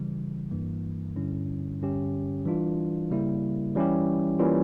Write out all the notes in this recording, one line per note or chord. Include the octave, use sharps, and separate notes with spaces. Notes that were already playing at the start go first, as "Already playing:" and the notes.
Already playing: C#3 E3 G3
G2 E3 A#3
G2 D3 G3 C#4 E4
G2 D3 G3 C#4 G4
E3 G3 D4 F4
C#3 G3 A#3 E4
E3 G3 C#4 E4 G4
E3 G3 A#3 C#4 F4